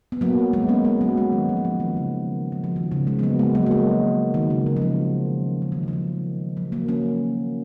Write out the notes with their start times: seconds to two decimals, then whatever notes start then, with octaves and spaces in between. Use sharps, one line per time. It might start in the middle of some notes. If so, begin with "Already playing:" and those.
0.12 B3
0.21 F#3 A#3
0.53 G#3 B3
0.69 A#3 C#4
0.85 G#3 B3
1.01 F#3 A#3
1.17 G#3
1.32 D#3
1.49 F3
1.57 F#3
1.65 F3
1.80 D#3
1.97 C#3
2.52 F#3
2.64 F3
2.76 D#3
2.92 C#3
3.07 G#3
3.19 B3
3.23 F#3 A#3
3.39 G#3
3.55 F#3 A#3
3.66 A#3
3.71 G#3
4.34 D#3
4.50 C#3
4.66 C#3
4.77 F3
4.82 D#3
5.62 C#3
5.72 D#3
5.83 C#3
5.88 F3
5.93 D#3
6.57 F#3
6.72 F#3 A#3
6.88 A#3 C#4